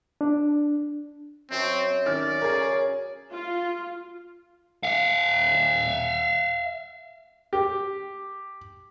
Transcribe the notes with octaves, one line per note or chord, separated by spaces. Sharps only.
D4
F#2 C4 F5 A5
D#3 C#4 D5 F6
C#3 G#4 A#4
F4
E5 F5
G4